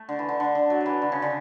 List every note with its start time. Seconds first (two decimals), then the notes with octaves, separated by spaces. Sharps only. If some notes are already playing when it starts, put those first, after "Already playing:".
Already playing: A3
0.09 D3
0.19 E3
0.29 D3
0.40 D3
0.55 D3
0.70 F#3
0.81 F#3
0.86 E3
1.02 D3
1.12 C#3
1.22 D3